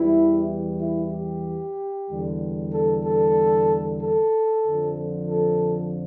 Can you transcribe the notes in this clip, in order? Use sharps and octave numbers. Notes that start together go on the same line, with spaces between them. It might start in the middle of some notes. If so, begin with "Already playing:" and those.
Already playing: E2 E3 G3 E4
E4
G4
E2 D3 G3
A4
A4
A4
F2 D3 F3
A4